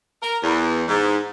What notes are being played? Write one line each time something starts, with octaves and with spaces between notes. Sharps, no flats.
A#4
E2
G#2